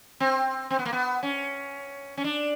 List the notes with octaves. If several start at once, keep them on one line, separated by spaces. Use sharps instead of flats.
C4
C4
B3
A#3
B3
C#4
C#4
D4